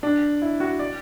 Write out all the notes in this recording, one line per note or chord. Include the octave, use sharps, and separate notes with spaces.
D4
E4
F#4
D5